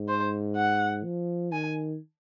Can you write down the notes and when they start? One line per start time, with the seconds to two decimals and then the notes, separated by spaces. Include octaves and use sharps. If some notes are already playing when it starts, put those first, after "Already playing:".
Already playing: G#2
0.08 C5
0.56 F#5
1.04 F3
1.53 D#3 G#5